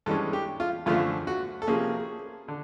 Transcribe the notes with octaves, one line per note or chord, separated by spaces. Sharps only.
G2 E3 G#3 C#4 A4
G4
F4
F#2 D3 F3 A3 F4
F#4
A4
C3 F3 A#3 C#4 G#4
D3